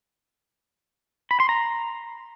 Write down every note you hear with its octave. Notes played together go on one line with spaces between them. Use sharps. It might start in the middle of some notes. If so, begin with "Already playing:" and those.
B5
C6
A#5